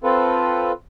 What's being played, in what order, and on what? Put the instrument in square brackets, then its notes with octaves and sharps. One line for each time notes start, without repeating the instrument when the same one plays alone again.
[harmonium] C4 F4 A4 B4